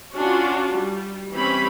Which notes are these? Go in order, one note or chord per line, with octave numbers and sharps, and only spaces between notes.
C#4 D4 F4 F#4
G3
E3 G3 C4 C#4 B5